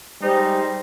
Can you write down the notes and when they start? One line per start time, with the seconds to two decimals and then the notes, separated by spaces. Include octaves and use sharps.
0.23 G3 G#3 D#4 C5